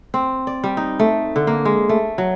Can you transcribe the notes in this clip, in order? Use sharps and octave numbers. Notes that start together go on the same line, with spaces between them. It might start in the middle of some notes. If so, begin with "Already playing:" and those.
C4
D5
G3
D#4
A3
D3
A#3
G#3
A3
F#3